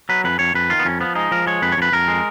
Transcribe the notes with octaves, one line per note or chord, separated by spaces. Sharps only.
F#3 B4
F2 B4
F2 C#5
F2 B4
D#3 F4
B3
F2 C#4
F3 B3
G#3 D#4
F3 A#4
G#3 C#5
F2 B4
C#5
F2 B4
F2 A#4
G#3